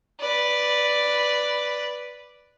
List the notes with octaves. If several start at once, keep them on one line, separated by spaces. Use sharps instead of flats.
B4 D5